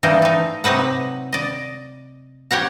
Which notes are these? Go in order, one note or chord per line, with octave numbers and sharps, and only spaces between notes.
E3 G3 A#3 D#4
A3 D#4
C3 F#3 D#4 B4 F#5
D5 D#5
G4 C#5 F#5 A#5